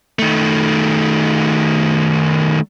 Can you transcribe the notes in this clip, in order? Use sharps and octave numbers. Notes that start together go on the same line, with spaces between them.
D#3 A3